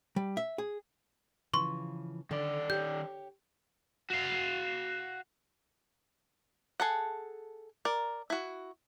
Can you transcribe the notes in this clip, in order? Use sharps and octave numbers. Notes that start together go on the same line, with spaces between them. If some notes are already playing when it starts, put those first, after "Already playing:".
G3
E5
G#4
C#3 E3 F3 C6 C#6
D3 D#3 D5
G4 C#5 G6
F#4 F5
G#4 A4 F#5
A#4 D5
E4 F#4